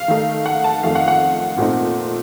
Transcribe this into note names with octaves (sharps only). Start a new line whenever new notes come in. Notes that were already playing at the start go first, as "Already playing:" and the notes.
Already playing: F5
D#3 A3 D#4
F#5
A5
F2 D#3 A3 F5
F#5
F#5
A#2 A3 C4 D#4